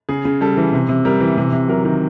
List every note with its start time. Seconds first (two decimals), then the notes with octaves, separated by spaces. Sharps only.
0.09 C#3 G#4
0.25 C#3
0.41 G3 A4
0.57 E3
0.73 C3
0.89 C3
1.05 G3 A#4
1.20 E3
1.38 C3
1.52 C3
1.68 F#3 A#4
1.85 D#3